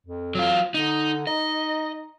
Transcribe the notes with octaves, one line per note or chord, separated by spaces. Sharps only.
F2
F#3 F4
D3 D#4
D#4 D#5